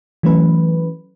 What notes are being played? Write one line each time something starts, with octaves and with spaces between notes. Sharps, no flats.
E3 F#3 A3 C#4 B4